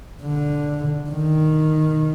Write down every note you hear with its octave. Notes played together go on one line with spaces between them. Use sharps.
D3
D#3